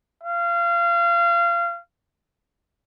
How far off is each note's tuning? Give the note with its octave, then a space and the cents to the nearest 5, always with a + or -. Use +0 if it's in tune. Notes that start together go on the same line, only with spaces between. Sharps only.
F5 -25